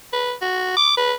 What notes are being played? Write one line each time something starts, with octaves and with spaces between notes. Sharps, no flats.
B4
F#4
D6
B4